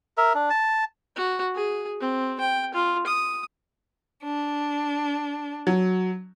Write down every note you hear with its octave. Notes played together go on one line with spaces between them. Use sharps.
A#4 E5
D4
A5
F#4
G#4
C4
G5
F4
D#6
D4
F#3